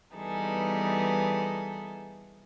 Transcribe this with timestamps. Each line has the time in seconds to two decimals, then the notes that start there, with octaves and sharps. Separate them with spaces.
0.15 E3 G3 B3 D#4 G#4 A4